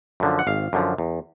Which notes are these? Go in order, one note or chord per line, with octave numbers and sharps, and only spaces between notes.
F#2 D3 F3
F#5
G#1 F5
F#2 D3 F3
E2